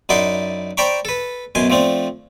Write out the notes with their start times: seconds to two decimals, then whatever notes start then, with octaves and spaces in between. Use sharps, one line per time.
0.09 F#2 D#4 E4 D5 F#5 C6
0.77 C5 D5 G5 A#5 B5 C#6
1.05 A4 B4
1.55 F#2 B2 G#5 C6
1.70 F3 A3 C4 D4